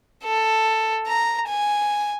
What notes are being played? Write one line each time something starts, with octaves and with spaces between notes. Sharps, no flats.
A4
A#5
G#5